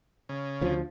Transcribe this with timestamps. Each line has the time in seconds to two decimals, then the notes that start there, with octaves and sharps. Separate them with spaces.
0.29 C#3
0.61 D2 F3